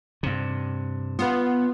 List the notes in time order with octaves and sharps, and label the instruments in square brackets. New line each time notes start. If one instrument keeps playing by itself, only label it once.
[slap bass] G2 C3
[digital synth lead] B3 [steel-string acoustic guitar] F4 B4